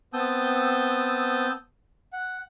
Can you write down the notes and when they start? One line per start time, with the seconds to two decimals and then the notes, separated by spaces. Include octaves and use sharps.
0.14 B3 C4 A5 D#6 E6 G6
2.13 F#5